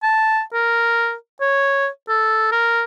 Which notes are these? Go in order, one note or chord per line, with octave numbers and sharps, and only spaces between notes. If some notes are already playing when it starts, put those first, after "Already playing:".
A5
A#4
C#5
A4
A#4